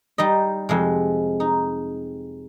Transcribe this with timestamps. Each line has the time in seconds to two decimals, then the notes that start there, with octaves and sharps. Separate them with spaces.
0.18 G3 D#4 D#5
0.69 F2 C3 G#3
1.40 D#4